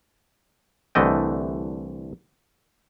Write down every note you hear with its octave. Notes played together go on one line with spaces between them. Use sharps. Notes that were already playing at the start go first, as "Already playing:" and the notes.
C2 D3 E3 A3 D#5 G5